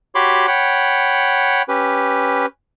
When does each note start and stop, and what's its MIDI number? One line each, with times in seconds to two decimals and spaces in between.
0.15 0.47 66
0.15 0.47 67
0.15 0.47 73
0.15 0.47 83
0.15 0.47 84
0.15 0.47 86
0.47 1.62 73
0.47 1.62 78
0.47 1.62 79
0.47 1.62 83
1.68 2.46 61
1.68 2.46 67
1.68 2.46 71